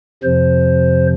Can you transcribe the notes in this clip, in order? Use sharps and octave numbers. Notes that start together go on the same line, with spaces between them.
F2 C3 F3 C5